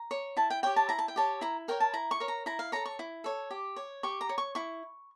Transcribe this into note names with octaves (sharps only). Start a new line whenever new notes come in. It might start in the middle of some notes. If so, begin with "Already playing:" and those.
Already playing: A#5
C#5
E4 A5
G5
G4 C#5 G5
A5
E4 A#5
A5
G5
G4 C#5 A5
E4 A#5
A#4 C#5 G5
A5
E4 A#5
C#6
A#4 C#5
A#5
E4 A#5
F5
A4 C#5 A#5
C#6
E4
A4 C#5
G4
C#5
G4 C#6
A#5
C#5
C#6
E4 C#6